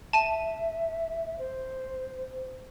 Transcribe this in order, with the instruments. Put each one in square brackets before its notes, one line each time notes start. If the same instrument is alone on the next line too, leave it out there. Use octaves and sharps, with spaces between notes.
[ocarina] E5 [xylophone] A5 D#7
[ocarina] C5